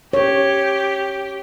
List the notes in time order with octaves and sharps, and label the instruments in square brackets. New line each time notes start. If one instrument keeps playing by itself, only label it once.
[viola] G4 [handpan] C#5